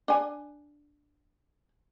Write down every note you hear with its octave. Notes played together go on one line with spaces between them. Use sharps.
D4 G#5